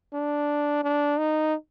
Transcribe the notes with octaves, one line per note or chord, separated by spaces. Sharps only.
D4
D4
D#4